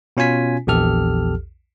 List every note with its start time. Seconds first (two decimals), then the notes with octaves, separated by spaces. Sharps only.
0.17 B2 C#4 F4 G#5 B6
0.67 A#1 E2 G4 A4 F6